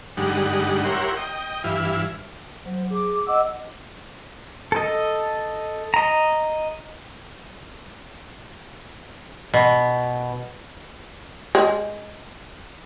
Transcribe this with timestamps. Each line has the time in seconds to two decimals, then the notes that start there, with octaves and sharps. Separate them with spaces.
0.17 G2 D3 G3 G#3 D#4 F#5
0.85 E4 G4 A#4 C#5 F#5 C6
1.17 D#5 G5
1.64 G2 E3 E4 F5
2.65 F#3 C5
2.91 G#4 D6
3.27 D#5 F#5 D6 E6
4.72 A4 D#5
5.94 D#5 A#5
9.54 B2
11.55 G#3